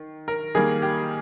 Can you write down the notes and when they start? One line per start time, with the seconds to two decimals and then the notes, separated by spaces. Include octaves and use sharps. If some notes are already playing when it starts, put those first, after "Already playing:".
Already playing: D#3
0.28 A#4
0.55 D#3 G3 A#3 G#4
0.82 G4